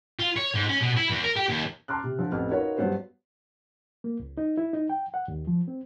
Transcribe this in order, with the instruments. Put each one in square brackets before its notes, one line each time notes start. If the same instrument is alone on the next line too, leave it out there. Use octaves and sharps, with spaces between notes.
[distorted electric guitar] F4
C#5
G#2
C#4
B2
E4
E2
A#4
G4
D#2
[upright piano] A5 A#5 C6 D6 F6 F#6
C3
D3 F3
A1 F2 B3 F6
D#4 F4 F#4 A#4 B4 C#5
G2 F#3 B3 F#4 C5
[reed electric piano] A#3
C#2
D#4
E4
D#4
G5
F#5
D#2
F3
C4